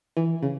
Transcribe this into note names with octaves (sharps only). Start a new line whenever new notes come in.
E3
C#3